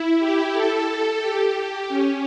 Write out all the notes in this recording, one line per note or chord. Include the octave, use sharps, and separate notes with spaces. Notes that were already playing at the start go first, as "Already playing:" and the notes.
Already playing: E4
G4
A4
G4
C#4